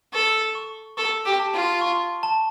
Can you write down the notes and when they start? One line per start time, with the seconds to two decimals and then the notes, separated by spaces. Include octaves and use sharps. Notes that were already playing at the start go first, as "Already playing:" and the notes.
0.13 A4 C#6
0.55 C#6
0.97 A4 C#6
1.25 G4
1.40 A5
1.54 F4
1.81 C#6
2.23 A5